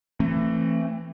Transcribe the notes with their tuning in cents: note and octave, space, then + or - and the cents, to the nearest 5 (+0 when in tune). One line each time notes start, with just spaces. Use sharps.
E3 +20 A3 +25 C4 +35